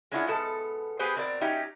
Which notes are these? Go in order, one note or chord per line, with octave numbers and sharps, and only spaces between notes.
G#3 C#4 D4 E4 F4 F#5
G#2 B2 B3 A4 A5
B3 G4 G#4 B4 C5
B2 C4 A#4 D5
F#3 C#4 D#4 G4 E5 F#5